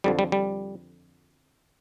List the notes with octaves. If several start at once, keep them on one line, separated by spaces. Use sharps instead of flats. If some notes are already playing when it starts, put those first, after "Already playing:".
F2 D3 F3 G3
G3
G3